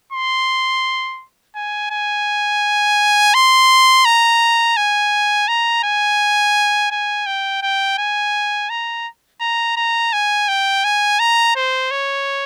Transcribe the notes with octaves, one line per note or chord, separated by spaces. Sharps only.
C6
G#5
G#5
C6
A#5
G#5
A#5
G#5
G#5
G5
G5
G#5
A#5
A#5
A#5
G#5
G5
G#5
A#5
C5
C#5